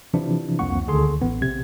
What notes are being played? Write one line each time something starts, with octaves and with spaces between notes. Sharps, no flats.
C3 E3 F3 D4 E4
C2 F2 A#3 F#5 C#6
D2 D3 D#3 G#4 A4 C6
A1 B3
A#1 C3 G#6